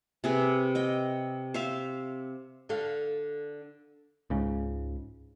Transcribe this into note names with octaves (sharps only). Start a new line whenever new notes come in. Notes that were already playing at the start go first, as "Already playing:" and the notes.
C3 G#4 B4
D#5 G5
C5 E5 F5
D3 A4 F5
C#2 G#2 C#3